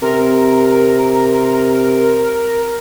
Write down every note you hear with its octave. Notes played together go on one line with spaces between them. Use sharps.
C3 A#4